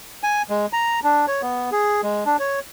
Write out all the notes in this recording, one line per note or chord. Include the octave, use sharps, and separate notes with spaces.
G#5
G#3
A#5
D4
C#5
B3
G#4
G#3
D4
C#5